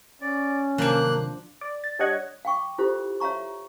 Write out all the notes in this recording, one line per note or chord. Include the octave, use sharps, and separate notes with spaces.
C#4 D5
C3 D#3 F3 F#3 A#3 D4 F#6
D5
A6
G3 D4 C#5 D#5 F#5 G#6
F5 G5 C#6 D6
E4 F4 G4 A4 C5
C#5 E5 F5 A#5 C#6